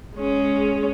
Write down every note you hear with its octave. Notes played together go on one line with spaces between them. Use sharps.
G#3 C#4